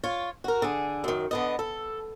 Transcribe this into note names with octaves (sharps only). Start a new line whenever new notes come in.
F4 C#5
F#4 A#4
D3 G#4
F#2 D#3
D3 B3 D#5
A4